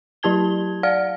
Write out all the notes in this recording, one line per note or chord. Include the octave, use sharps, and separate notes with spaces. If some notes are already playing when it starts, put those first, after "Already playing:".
F#3 E4 G4 A5 G#6 G7
D5 F5 F#5 F6